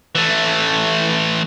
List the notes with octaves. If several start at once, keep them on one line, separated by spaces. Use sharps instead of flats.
E3 A3